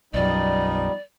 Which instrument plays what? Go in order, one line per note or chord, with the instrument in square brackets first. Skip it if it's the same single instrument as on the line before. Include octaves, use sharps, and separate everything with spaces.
[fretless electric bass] B1 F#2 [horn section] F3 B3 D#4 [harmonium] G3 [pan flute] D5